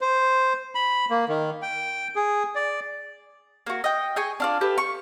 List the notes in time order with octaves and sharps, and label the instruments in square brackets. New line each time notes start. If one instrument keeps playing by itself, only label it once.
[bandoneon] C5
B5
A#3
D#3
G5
G#4
D5
[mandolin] A#3 F#4
D#5 G5
G#4 G5 G#5 C#6
D4 F4 D5
G4 A4 B4
C#6